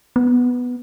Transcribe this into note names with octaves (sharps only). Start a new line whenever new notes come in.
B3